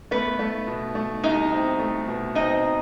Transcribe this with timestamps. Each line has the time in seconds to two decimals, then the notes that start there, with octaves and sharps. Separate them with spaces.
0.11 A3 B3 B4
0.39 A3
0.67 B2
0.95 A3
1.23 C2 D#4 D#5
1.52 C4
1.79 A3
2.07 B2
2.35 C4 D#4 D#5